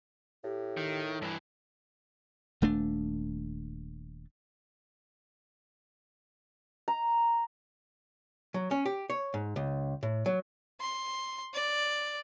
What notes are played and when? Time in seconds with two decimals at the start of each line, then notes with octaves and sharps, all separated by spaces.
0.44 A2 G4
0.77 D#3
1.22 G2 E3
2.62 D#1 A3 D4
6.88 A#5
8.54 F#3
8.71 C#4
8.86 G4
9.10 C#5
9.34 G#2
9.56 C#2
10.03 A2
10.26 F#3
10.80 C6
11.54 D5